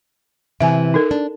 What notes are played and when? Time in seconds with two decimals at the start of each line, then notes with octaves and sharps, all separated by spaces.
0.60 C3 E3 E5 G#5
0.94 D#4 A4 A#4
1.11 D4